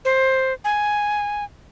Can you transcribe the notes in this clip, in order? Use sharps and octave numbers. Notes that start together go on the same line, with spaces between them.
C5
G#5